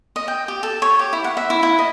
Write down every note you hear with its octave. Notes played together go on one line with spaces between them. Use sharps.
D#5
G5
G4
A4
C#5
G4
E4
F#5
E5
E4
E4
D#5